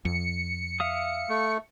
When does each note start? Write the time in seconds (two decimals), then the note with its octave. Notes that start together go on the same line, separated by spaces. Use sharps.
0.05 F2 C#7
0.80 E5 F5 D#6
1.29 A3